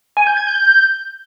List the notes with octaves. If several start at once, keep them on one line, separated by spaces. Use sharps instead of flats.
G#5
G6
G#6
G6